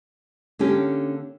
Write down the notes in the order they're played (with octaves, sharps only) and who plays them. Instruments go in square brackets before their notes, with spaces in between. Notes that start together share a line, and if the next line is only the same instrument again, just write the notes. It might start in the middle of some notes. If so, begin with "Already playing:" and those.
[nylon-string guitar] D3 A#3 C#4 G4